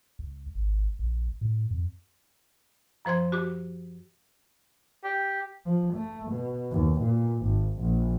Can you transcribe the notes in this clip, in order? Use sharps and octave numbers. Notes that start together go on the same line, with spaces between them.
C#2
G#1
A#1
A2
F2
F#2 F3 C5 C6 G#6
F#4 G4 D6
G4
F3
A3
B2
D#2
A#2
G#1
A#1